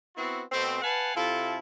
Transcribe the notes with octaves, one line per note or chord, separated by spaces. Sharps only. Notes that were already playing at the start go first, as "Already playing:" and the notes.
B3 C4 E4 F#4
B2 A3 C4
B4 F5 F#5 G#5 A5
C3 E4 F4 A4